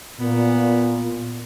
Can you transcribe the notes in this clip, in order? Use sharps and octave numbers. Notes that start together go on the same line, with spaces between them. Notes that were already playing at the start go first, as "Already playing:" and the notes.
A#2 B3